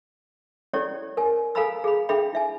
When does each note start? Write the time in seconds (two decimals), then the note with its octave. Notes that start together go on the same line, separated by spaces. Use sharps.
0.73 C#4 E4 G4 A4 C#5 D5
1.17 A#4 G#5
1.55 A4 F5 G#5 A#5 B5 E6
1.84 G#4 A4 F5 B5
2.09 D4 G#4 A4 E5 G5 B5
2.33 E4 E5 G#5